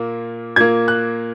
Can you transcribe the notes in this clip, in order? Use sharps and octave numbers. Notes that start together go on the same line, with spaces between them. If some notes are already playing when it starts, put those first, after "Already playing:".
Already playing: A#2 A#3
A#2 A#3 G#6
F#6